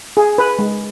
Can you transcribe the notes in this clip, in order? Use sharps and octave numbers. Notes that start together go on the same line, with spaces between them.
G#4
B4
G#3